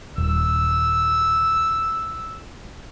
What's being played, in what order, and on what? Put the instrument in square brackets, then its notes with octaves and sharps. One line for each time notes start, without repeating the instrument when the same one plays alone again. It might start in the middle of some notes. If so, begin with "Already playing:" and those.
[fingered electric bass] D#1 [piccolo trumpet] E6